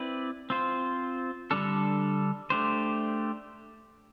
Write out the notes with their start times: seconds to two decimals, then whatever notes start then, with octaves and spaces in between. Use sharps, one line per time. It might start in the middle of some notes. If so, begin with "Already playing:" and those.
Already playing: C4 E4 B4 D5
0.50 C4 F4 C5
1.51 D3 G3 D4 A4
2.50 A3 D4 G4 C5